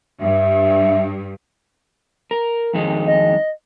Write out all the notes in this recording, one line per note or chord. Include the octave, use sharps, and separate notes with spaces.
G2 E5
A#4
F2 D#3 G#3
D#5